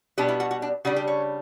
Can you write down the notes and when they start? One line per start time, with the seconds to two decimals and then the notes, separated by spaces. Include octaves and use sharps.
0.18 B2 G3 B3 D4 G4
0.28 E4
0.40 F#4
0.51 F#4
0.62 D4
0.85 C#3 G3 D4 F#4
0.96 G4
1.08 C#5